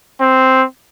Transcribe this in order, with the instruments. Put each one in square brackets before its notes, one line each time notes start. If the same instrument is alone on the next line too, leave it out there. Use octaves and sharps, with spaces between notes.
[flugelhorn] C4